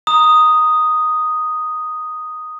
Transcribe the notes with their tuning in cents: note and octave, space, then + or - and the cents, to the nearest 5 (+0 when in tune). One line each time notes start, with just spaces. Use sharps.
A#5 +0 D#6 +0